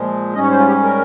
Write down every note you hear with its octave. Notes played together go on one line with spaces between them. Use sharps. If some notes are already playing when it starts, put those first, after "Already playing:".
Already playing: A#2 F3 G#3
G#2 G3 C#4 D#5
C#5
C5
F4
G4
A#4